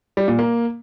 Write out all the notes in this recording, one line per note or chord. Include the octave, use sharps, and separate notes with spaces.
G3
A#2
A#3